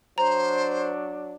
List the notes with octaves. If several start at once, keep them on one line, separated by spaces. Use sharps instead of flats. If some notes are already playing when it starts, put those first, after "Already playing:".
F#3 D4 C5 A#5